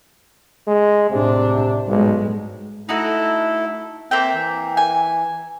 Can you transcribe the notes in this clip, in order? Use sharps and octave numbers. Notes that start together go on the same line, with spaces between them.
G#3
A2 C3 D4
B1 G#2 G#3
A3 D#4 E4 F#4 A4
A#3 C4 E5 G5
E3
G#5